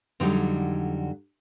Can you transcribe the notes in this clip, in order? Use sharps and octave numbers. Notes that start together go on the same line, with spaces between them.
F2 D3 F#3 G3 D#4